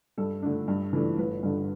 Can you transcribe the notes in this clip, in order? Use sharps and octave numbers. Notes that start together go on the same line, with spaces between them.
G2 A4
D3 A3 D4
G2
E3 A3 D4
G1 B4
G2 D3